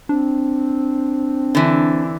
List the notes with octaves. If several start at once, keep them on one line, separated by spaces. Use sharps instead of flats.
C4 D4
D3 E3